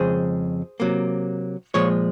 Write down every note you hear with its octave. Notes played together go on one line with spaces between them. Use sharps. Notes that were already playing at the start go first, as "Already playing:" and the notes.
Already playing: F2 C#3 G#3 G#4 C5
C3 F#3 A#3
A#2 F3 G#3 C#5